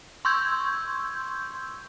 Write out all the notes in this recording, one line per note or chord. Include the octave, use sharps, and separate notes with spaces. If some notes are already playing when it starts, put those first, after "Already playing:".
C6 C#6 E6 G6 G#6